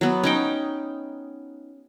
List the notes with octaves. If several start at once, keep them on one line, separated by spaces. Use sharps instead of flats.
F#3 B3
C#4 D#4 G5